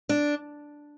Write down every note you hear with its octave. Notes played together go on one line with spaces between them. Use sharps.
D4